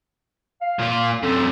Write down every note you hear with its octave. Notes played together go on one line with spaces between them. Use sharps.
F5
A#2 F4
F#2 C3 A4